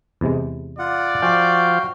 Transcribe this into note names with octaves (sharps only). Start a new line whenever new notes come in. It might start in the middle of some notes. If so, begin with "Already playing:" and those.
E2 C3 G#3
F4 D5 F#5
F3 F#4 F5 G5 G#5